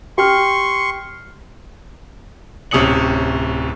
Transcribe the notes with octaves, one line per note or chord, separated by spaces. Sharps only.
G4 C6 C#6 F6
D1 C3 C#4 D#6 C#7 F#7